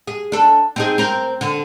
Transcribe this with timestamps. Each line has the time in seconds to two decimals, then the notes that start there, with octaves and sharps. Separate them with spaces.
0.07 G#4
0.32 D4 A4
0.76 C4 D#4 G#4
0.98 C4 A#4
1.41 D3